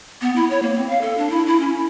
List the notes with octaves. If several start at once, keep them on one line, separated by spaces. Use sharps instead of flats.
B3
E4
C#5
A#3
C4
F5
A4
D4
E4
E4
C#4
E4